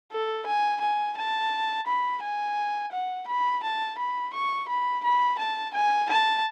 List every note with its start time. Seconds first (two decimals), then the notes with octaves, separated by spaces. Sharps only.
0.12 A4
0.47 G#5
0.82 G#5
1.17 A5
1.87 B5
2.22 G#5
2.92 F#5
3.28 B5
3.63 A5
3.98 B5
4.33 C#6
4.69 B5
5.04 B5
5.39 A5
5.74 G#5
6.09 A5